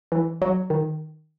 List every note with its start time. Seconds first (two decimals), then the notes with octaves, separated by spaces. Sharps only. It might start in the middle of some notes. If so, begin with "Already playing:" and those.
0.12 E3
0.42 F#3
0.70 D#3